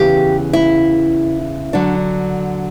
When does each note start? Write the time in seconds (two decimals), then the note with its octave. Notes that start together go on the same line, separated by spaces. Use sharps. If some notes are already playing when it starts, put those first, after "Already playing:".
Already playing: E2 C#3 E3 G4
0.53 E4
1.73 D3 F#3 D4